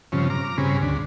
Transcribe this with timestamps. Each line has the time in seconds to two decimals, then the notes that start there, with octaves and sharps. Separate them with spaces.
0.12 G2 C#3 F3 C4 C#4
0.30 A#5 D6 F6
0.58 G2 C#3 C4 C#4 G#4 B5
0.82 D2 D4